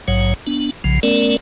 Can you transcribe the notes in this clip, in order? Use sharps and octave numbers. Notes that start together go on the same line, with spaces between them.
A#1 G#2 F#3 C#5 F#5
B3 D4
B1 C#3 F3
A3 B3 C#4 A#4 D5